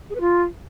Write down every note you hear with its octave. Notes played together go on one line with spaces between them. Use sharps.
G#4
B4
F4